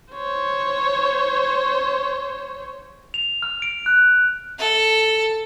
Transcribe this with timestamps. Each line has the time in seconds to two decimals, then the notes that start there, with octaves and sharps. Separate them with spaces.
0.14 C5 C#5
3.14 F7
3.42 F6
3.62 D7
3.86 F#6
4.59 A4